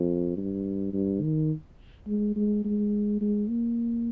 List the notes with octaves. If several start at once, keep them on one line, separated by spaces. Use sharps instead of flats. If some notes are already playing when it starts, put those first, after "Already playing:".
Already playing: F2
G2
G2
D#3
G#3
G#3
G#3
G#3
A#3